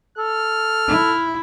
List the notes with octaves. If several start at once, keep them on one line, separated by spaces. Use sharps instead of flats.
A4 F6
E4